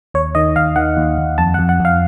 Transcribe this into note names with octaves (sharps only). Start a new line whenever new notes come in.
D#2 C#5
D#3 D#5
D#2 F5
D#3 F#5
D#2
D#2
F2 A5
F#5
F2
F#5
F2 F5